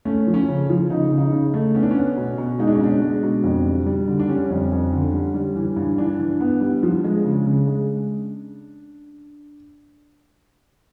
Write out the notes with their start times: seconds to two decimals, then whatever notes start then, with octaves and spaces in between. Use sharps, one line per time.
0.05 A3 C#4
0.27 F3
0.34 C#4
0.48 C#3
0.69 F3
0.90 C#3 D#4
1.11 C#3
1.18 D#4
1.32 C#3
1.54 A3
1.75 B3 C#4
1.83 D4
1.91 C#4
1.96 B3
2.17 B2
2.38 B2
2.59 G#3 D#4
2.67 D4
2.75 C#4
2.81 B2 D4
3.02 G#3
3.23 B2
3.44 F2
3.65 G3
3.86 G3
4.08 D3
4.19 D4
4.28 G3 C#4
4.50 F2
4.72 F2
4.92 D3
5.13 G3
5.34 G3
5.56 E3
5.76 G2
5.98 E3 D4
6.19 E3
6.40 B3
6.61 G3
6.83 F3
7.04 G#3
7.25 C#3
7.46 C#3
7.67 G#3